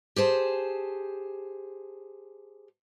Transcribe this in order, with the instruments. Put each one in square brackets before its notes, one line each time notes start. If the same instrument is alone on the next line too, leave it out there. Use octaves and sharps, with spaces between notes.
[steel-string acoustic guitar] G4 G#4 C5 A5